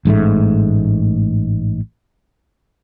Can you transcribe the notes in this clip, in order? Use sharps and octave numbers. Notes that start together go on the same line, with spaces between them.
A1 G#2 B2 A3